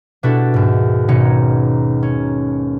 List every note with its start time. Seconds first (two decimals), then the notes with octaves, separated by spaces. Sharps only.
0.23 B2 D4 E4 F#4 G4 A4
0.54 D#2 G#2
1.08 G#1 B2 C#4 D#4 A#5 C#7
2.03 C#4